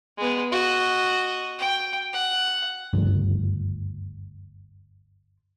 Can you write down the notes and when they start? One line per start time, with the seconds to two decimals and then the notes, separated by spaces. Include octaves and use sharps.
0.18 G#3 B3
0.52 F#4 D#5
1.58 G5
2.13 F#5
2.93 F#1 D2 G2 F3